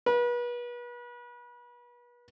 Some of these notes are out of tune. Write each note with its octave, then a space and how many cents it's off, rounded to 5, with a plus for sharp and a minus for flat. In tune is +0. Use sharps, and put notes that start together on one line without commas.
B4 -35